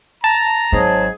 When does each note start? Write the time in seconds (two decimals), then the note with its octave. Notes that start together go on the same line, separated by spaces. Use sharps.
0.24 A5 A#5
0.72 G#1 G#2 F#3 G#4